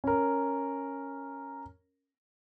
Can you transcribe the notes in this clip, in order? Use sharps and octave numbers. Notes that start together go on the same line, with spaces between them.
C#4 A#4